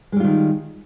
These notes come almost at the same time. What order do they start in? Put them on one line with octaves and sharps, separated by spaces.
G#3 G3 F4 D#3